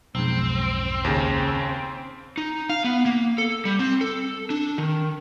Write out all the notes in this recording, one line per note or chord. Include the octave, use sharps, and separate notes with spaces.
B1 F2 G#2 C4
D#2 C#3
D#4
F5
B3
A#3
A4
G3
C4
A4
D4
D#3